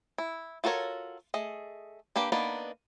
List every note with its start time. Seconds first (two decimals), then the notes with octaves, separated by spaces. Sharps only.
0.18 E4
0.64 F4 F#4 A4 A#4 C#5
1.34 A3 G#4 D#5
2.16 A#3 D4 G4 B4
2.32 A#3 B3 D4 D#4 B4